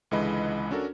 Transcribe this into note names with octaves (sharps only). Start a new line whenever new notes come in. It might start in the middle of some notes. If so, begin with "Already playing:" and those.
C#2 D3 E3 G#3 D#5 B5
C#4 D4 F#4 A4 A#4